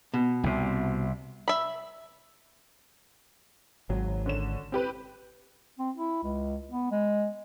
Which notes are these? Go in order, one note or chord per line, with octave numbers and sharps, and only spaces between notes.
B2
C2 C3
E5 B5
G#1 F#3
D3 C#4 E7
C4 G4 B4
C4
E4
C#2
B3
G#3